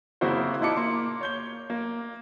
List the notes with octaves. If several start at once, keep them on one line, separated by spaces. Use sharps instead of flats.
C#3 A#3 C4 E4 F#4 C5
A#2 D#4 E4 A5 D6 C#7
A#3 C6
C#5 G6 G7
A#3